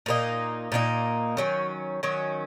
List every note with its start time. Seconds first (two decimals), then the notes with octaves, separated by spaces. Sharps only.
0.06 A#2 A#3 D#4
0.72 A#2 A#3 D#4
1.37 D#3 F#3 C#4
2.03 D#3 F#3 C#4